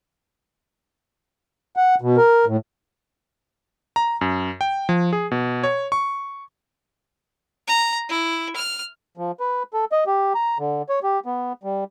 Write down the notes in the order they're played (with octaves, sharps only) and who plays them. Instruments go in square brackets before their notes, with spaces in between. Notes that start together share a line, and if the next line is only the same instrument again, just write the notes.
[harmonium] F#5
B2
A#4
A2
[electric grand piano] A#5
F#2
G5
F3
G#4
B2
C#5
C#6
[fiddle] A#5
E4
F6
[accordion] F3
B4
A4
D#5
G4
A#5
D3
C#5
G4
B3
G3